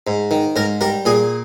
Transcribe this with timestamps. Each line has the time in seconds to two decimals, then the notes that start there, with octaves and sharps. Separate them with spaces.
0.07 G#2
0.31 D#3
0.56 G#2 A#4
0.81 G3 A#4
1.05 A#2 G#4